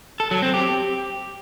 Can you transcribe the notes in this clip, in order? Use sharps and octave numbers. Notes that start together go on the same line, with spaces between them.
A4
F#3
C4
G4